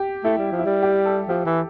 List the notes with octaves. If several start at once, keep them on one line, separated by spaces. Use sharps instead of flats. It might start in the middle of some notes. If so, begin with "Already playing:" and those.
Already playing: G4
A3 E4
G3
F3
E4
G3
G4
A4
F3 G4
E3